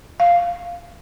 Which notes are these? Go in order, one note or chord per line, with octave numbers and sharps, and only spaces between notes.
F5